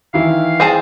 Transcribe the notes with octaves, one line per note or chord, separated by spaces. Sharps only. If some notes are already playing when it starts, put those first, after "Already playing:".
D#3 E3 E4 F5
C4 G#4 A5